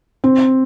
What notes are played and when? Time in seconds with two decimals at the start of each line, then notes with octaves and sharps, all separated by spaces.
0.24 C4